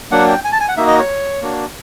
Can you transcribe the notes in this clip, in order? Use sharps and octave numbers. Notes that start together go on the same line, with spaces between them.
F#3 A#3 D4 F#5
G5
G#5
A5
G#5
F#5
A#3 D#4 F#4 E5
D#5
C#5
A#3 D4 F#4